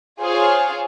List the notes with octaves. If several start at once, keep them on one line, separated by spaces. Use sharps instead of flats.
F4 G#4 C5 C#5 F5